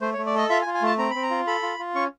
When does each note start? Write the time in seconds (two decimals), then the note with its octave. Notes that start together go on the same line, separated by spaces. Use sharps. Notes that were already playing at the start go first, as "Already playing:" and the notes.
0.01 A3 C5
0.14 C#5
0.18 A3
0.26 D5
0.35 A4 D#5
0.50 F4 E5
0.62 G#5
0.66 F4
0.74 G#5
0.82 A3 A5
0.98 C4 A#5
1.11 C4 B5
1.23 A#5
1.30 F4
1.47 A4 B5
1.63 F4
1.79 F4
1.95 C#4 C#6